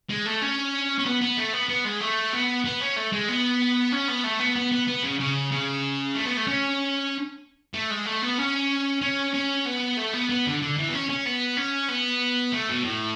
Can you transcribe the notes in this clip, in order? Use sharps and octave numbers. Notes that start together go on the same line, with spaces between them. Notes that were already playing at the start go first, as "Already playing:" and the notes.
G#3
A3
C#4
C#4
B3
B3
A3
B3
B3
G#3
A3
B3
B3
C#4
A3
G#3
B3
C#4
B3
A3
B3
B3
B3
B3
C#3
C#3
C#3
A3
B3
A3
C#4
A3
G#3
A3
B3
C#4
C#4
C#4
B3
A3
B3
B3
D3
D3
E3
B3
C#4
C#4
B3
C#4
B3
A3
B2
A2